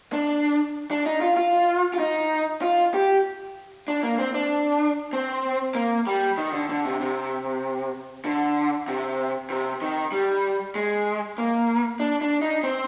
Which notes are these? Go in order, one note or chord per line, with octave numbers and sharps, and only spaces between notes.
D4
D4
D#4
F4
F4
F4
D#4
F4
G4
D4
A#3
C4
D4
C4
A#3
G3
D#3
D3
D3
C3
C3
D3
C3
C3
D#3
G3
G#3
A#3
D4
D4
D#4
C4